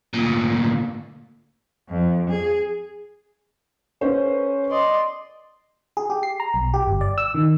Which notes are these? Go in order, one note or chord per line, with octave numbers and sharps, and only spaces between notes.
D2 A#2
F2
G#4
C#4 A4 B4 C5
D5 D#5 C6
G#4
G4
C7
A#5
B1
G4
G1
D5
E6
D#3